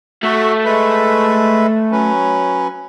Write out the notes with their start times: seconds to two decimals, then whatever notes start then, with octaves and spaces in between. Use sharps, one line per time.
0.23 A3 F#4 E5
0.65 G#3 B4 E5
1.92 F#3 C#4 B4